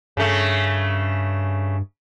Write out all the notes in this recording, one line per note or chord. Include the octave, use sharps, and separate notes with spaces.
G2 C#3 A3